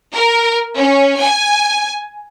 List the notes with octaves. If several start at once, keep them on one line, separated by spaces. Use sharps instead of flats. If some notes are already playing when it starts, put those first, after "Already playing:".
A#4
C#4
G#5